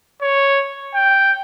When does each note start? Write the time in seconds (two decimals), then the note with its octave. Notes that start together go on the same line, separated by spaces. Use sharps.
0.22 C#5
0.95 G5